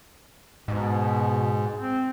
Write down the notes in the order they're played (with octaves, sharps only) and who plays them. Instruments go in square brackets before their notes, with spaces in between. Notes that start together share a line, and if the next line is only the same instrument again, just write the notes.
[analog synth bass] G#2 [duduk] B2
[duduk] C4